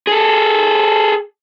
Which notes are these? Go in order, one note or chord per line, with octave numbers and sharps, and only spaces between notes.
G#4 A4